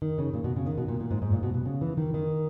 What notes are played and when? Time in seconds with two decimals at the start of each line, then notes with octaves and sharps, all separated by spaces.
0.02 D#3
0.18 C#3
0.33 A#2
0.44 B2
0.56 C#3
0.66 D#3
0.78 B2
0.88 A#2
1.00 A#2
1.11 G#2
1.22 G#2
1.32 A#2
1.43 B2
1.54 B2
1.65 C#3
1.81 E3
1.97 D#3
2.14 D#3